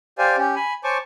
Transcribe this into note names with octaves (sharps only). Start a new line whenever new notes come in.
G4 C5 D5 F5 G#5
C#4 G4
G#5 B5
C5 C#5 G#5 A5 C#6 D6